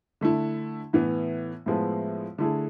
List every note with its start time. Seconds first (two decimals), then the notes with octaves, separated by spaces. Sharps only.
0.21 D3 A3 E4
0.93 A2 E3 B3
1.66 A2 F3 G#3 B3
2.38 D3 A3 E4 G#4